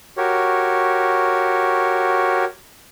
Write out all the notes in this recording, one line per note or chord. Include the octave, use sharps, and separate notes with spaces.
F#4 G4 A#4 C#5